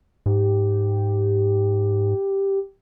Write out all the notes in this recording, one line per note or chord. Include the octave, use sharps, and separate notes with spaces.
G#2 G4